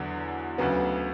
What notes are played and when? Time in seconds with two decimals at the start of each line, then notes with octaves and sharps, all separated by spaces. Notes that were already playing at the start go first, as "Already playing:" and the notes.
Already playing: E2 D3 F#3
0.58 D2 C#3 F#3 B3